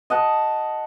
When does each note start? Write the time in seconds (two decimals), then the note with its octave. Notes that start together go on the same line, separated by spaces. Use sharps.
0.10 D#5 F#5 A5